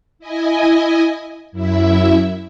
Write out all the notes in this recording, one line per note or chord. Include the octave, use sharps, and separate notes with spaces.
E4 D#5 G#5
F#2 E4 E5